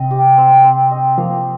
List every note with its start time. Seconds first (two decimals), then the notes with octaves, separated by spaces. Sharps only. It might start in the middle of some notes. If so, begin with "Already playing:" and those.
Already playing: C3 C4 D#5
0.11 G4
0.37 C4
0.64 C4
0.91 D#5
1.18 F3 A#3